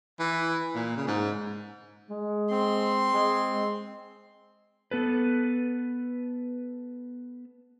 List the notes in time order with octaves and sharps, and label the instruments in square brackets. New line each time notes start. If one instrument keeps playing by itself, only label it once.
[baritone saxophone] E3
A#2
C#3
G#2
[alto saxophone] G#3
[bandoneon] C4 [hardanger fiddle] C6
[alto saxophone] G#3
[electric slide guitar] B3 A4 B4